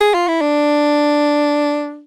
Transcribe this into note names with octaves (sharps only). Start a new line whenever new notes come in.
G#4
F4
E4
D4